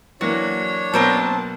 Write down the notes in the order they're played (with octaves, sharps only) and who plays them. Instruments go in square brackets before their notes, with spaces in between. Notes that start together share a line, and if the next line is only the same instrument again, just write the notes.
[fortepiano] E3 F#3 A#3 [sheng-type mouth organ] D4 C#5 [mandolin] F#4
[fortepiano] B2 F#3 A#3 [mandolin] C4 A#4 C5 [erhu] A5